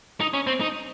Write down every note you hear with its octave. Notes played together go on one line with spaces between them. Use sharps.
D#4
C#4
C4
D#4